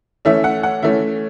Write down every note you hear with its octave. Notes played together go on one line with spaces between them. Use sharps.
E3 A3 C#4 E5
F#5
F#5
E3 A3 C#4 E5